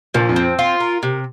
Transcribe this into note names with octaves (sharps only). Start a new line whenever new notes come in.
A#1 A#2 F3
F2
C4
F4
A#4
C3